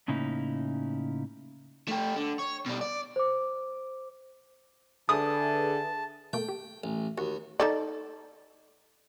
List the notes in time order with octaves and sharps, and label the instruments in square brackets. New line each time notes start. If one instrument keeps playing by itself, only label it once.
[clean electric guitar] A2 C#3 A#3 C#4 D#4 E4
[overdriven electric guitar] A3 G4
D3
C#5
B2 G3
D5
[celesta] C5 D6
[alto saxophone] D3 [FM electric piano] G#4 B4 E5 [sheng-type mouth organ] A5 [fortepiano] D#6
[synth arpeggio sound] B2 A3 A#3 [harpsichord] G5
[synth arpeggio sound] G4
[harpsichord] A1
[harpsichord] D#2 [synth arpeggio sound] F#4
[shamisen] D#4 A4 D5